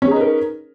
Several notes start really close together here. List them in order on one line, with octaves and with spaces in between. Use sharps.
C#4 G#4 D#4 B4 A#4